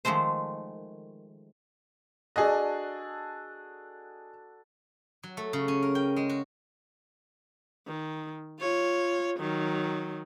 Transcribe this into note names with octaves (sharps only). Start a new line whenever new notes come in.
D#3 F3 G#3 A3 C5
D4 F#4 G#4 A4 D#5
F#3
A3
C#3
C#4
A#4
G5
G#3
F#4
D#3
F4 C#5
D#3 F#3